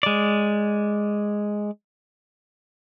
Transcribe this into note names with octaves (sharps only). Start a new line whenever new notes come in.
G#3 D5